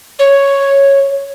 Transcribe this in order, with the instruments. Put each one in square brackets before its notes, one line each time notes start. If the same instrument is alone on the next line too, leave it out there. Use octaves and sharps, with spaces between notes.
[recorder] C#5